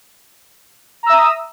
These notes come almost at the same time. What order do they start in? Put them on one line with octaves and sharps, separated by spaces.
A#5 E6 E5 D#6